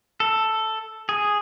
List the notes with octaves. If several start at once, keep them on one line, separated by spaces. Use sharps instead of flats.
A4
G#4